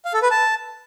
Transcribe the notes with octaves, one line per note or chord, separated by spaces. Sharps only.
F5
A4
B4
A5